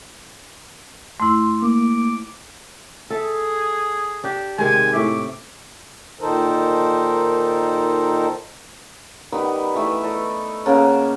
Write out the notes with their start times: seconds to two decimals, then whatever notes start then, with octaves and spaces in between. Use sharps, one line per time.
1.20 F2 A3 E4 C6
1.62 A#3 D6
3.10 G#4 A4 E5
4.24 D4 G4
4.58 C3 D#3 G#3 G#5
4.93 A2 E5 D6
6.21 A#2 D#3 D#4 A4 A#4 C5
9.32 D#3 G3 B3 B4
9.75 E3 A3 B4 E5
10.03 A4 D5 D#5
10.65 C#3 A#3 F#5 A5